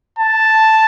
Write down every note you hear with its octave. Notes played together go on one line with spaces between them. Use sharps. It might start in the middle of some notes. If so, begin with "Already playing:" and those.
A5